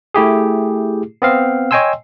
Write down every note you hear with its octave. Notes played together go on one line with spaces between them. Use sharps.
A3 E4 G4 G#4
B3 C4 F5
C#5 D#5 G5 G#5 C6 E6